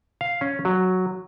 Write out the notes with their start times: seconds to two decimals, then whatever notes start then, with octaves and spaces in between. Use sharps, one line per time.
0.21 F5
0.41 C#4
0.65 F#3